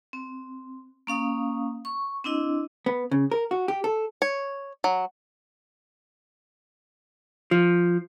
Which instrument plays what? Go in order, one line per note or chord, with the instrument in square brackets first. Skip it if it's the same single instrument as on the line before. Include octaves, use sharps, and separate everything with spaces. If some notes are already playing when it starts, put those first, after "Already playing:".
[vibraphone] C4
A#3 C#4 F5 D#6
C#6
C4 D4 E4 D#5
[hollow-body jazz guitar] B3
C#3
A#4
F#4
G4
A4
[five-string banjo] C#5
F#3
[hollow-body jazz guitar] F3